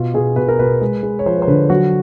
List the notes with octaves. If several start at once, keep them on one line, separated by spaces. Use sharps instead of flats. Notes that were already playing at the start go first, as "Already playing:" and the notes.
Already playing: B2 F4
B2 G#4
B2 B4
A#4
B2 B4
G#3
G#3
C#5
F3 C5
B4
C5
D3 B4
F#3 F#4